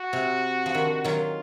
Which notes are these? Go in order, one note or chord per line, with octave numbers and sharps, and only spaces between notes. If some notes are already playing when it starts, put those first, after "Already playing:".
Already playing: F#4
C3
F3
D#3
D#3 F#3 F4